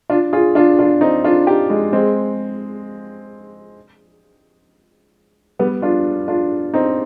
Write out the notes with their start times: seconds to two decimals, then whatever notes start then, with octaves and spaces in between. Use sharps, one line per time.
0.10 D4 F4
0.33 F4 G#4
0.55 D4 F4
0.79 D4 F4
1.01 C4 D#4
1.24 D4 F4
1.47 D#4 G4
1.70 G#3
1.93 G#3 C4
5.59 G3 B3
5.82 D4 F4
6.28 D4 F4
6.74 C4 D#4